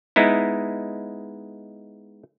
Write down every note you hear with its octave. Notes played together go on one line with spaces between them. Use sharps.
G#3 B3 D#4 E4